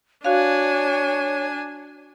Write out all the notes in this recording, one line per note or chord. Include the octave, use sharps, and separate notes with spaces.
D4 F#4 C#5 F5 G#5